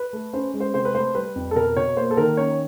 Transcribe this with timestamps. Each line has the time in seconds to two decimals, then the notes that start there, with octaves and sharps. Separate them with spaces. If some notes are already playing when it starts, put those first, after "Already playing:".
Already playing: B4
0.13 A3
0.33 C#4 C5
0.54 G#3
0.60 C5
0.74 C3 C5
0.85 B4
0.95 A3 C5
1.15 G3 B4
1.36 F2
1.51 A4
1.56 B2 A#4
1.76 B2 C#5
1.97 A#3 C5
2.11 A4
2.17 D#3 A#4
2.37 C#4 C#5